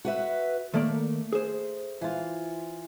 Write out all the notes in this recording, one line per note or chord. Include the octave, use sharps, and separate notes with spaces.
F#4 B4 E5
D#3 A3 A#3 D5
G#4 C5
E3 F4